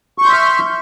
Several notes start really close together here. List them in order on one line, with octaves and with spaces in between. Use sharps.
C#6 G6 C6 E5 F6